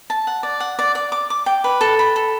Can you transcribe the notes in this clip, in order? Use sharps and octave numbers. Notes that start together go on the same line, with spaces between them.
A5
F#5
D5
F#5
D5
D5
D6
D6
G5
B4
A4
B5
A4